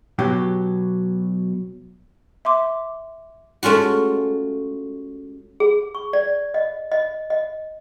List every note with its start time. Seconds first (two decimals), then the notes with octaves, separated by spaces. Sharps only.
0.19 B2 F#3 G4
2.45 E5 C6 D6
3.63 G#3 A3 C#4 F4 F#4
5.60 G#4
5.95 C#6
6.13 D5
6.54 D#5
6.92 D#5
7.30 D#5